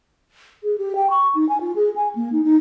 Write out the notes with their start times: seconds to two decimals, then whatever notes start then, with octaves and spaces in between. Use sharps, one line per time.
0.63 G#4
0.78 G4
0.95 G5
1.10 C#6
1.35 D#4
1.49 G#5
1.61 F4
1.76 G#4
1.96 G#5
2.15 A#3
2.32 D#4
2.44 D#4